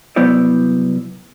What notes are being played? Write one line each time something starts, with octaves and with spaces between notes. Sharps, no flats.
C2 F#3 B3 E4 C5 D5